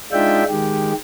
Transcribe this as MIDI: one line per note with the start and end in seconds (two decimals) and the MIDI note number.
0.12 0.44 56
0.12 0.44 62
0.12 0.44 63
0.12 0.44 65
0.12 0.44 76
0.12 0.44 79
0.49 0.93 51
0.49 0.93 56
0.49 0.93 67